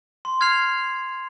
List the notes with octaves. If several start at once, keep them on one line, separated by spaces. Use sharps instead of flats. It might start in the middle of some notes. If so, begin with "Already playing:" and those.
C6
F6 G#6 C7 F7